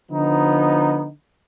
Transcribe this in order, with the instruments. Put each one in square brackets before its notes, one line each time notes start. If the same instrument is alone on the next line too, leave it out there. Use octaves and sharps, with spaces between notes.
[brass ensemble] D3 F3 B3 D#4